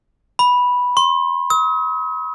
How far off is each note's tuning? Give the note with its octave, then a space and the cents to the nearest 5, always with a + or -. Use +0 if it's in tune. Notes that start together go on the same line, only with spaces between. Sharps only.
B5 -5
C6 +35
D#6 +45